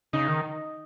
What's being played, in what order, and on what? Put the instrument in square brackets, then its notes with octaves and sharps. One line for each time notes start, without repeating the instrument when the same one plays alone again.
[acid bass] C#3 [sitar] D#4
[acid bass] D#3